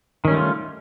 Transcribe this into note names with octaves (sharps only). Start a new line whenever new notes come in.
D#3 G3 A3 C#4 F4